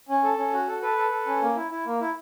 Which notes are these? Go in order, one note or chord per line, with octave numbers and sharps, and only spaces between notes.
C#4
A4
C#4
F#4
A4
A4 B4
A4
A4
C#4
A#3
E4
E4
A#3
E4